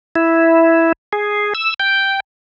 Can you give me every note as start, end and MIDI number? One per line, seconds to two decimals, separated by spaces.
0.16 0.92 64
1.13 1.53 68
1.55 1.74 88
1.80 2.20 79